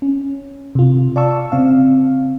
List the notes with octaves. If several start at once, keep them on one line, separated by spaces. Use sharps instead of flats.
C#4
C3 F4
D5 F5 A5 C#6 E6
C#3 C4 F5